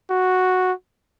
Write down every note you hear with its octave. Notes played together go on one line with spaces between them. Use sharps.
F#4